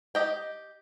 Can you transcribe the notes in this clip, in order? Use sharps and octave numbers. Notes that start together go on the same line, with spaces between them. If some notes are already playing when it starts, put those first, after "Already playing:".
G4 D#5 G5